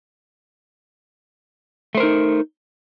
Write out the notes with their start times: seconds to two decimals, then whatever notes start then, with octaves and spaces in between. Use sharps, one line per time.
1.95 A3
1.97 C5
2.00 A#4
2.03 D#4